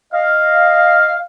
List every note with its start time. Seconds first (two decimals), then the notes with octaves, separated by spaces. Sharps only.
0.13 D#5 F5